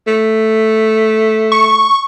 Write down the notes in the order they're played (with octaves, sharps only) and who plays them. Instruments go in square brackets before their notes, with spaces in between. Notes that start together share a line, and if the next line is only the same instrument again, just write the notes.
[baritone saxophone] A3
[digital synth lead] C#6